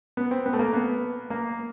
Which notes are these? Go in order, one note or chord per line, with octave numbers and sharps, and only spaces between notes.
B3
C4
B3
A3
A#3
B3
A#3